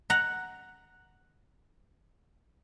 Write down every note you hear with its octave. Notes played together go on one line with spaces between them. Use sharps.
F#5 A#5